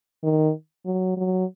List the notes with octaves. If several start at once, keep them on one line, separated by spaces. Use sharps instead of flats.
D#3
F#3
F#3